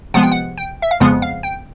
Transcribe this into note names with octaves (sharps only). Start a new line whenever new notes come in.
C3 F3 G#3 B3 F#5
G5
F#5
G5
E5
F5
F2 C#3 F3 G#3 B3 F#5
F5
G5